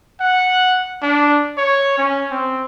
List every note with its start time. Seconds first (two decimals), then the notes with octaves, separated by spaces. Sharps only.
0.21 F#5
1.02 D4
1.58 C#5
1.98 C#4
2.31 C4